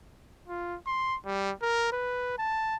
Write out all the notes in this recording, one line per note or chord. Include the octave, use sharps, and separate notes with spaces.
F4
C6
G3
A#4
B4
A5